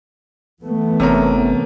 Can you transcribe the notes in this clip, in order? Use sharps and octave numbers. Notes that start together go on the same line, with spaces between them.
E3 A3 B3
G1 C3 C#4 A#4